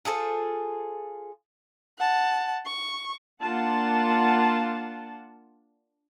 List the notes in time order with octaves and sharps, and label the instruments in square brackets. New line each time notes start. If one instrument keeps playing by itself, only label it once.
[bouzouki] F4 G#4 A4 C5
[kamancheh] F#5 A5
C#6
[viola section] A#3 D4 F4 F#5 A5